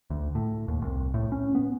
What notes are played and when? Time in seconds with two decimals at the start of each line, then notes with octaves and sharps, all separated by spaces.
0.10 D2
0.35 A2
0.68 D#2
0.82 C2
1.14 A2
1.32 C#4
1.55 B3